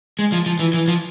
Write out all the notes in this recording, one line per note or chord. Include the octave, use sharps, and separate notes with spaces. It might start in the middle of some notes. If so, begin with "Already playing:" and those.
G#3
F3
F3
E3
E3
F3